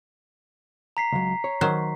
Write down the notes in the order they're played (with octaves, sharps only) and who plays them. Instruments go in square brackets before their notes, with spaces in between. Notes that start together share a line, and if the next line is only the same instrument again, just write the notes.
[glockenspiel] A#5 B6 C7
[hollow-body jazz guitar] C#2 F#3
C#5
[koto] D#3 F#3 C5